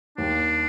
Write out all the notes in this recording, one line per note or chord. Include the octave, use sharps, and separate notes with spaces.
D#2 D4